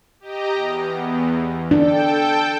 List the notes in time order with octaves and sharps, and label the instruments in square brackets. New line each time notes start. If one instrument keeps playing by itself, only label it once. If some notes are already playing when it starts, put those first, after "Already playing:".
[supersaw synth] G4 D#5 A#5
E2
[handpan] D4 [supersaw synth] A4 G5